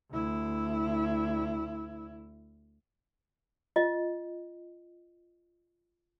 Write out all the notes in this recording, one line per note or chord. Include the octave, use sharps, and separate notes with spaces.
D2 E4
F4 D#5